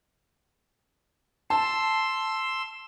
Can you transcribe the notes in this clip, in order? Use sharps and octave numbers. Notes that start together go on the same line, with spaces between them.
A5 C6 E6